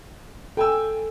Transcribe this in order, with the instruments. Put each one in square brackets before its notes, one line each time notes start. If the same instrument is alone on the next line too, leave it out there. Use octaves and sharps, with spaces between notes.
[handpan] A4 [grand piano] G5 G#5 E6